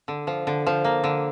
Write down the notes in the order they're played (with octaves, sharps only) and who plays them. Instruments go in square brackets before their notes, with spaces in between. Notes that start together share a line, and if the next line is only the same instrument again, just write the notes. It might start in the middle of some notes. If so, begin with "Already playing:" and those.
[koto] D3
F3
D3
F3
A#3
D3